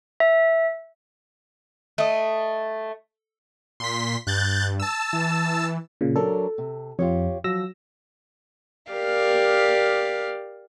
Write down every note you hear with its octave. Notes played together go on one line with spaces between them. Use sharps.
E5
A3 D#5
A#2 C6 B6
G2 F#6 G6 A6
A5 E6
E3
A#2 C#3
F#3 D4 A4 A#4
C3
F2 F4 G4 C#5
F3 F#3 E6 A#6
G4 A#4 D5 F5